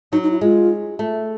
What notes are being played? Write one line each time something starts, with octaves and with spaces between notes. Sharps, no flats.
F#3 D#4
D#4
E4
G#3 F4
A3